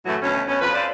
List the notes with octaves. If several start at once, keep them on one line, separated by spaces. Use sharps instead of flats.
F#2 A2 E3 F#3 A3
D2 B2 C#4
B2 C#4
F2 F3 B4
A4 B4 C5 D5 F5